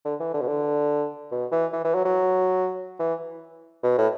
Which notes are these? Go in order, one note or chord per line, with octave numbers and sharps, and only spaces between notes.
D3
E3
D3
B2
D3
B2
E3
E3
E3
F#3
F#3
E3
B2
A2